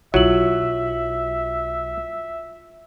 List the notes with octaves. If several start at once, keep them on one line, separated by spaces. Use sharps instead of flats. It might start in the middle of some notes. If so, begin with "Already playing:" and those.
B1 F#3 E4 F4 E5 F#7